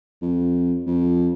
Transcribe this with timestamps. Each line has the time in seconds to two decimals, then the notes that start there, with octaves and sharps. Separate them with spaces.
0.22 F2
0.87 F2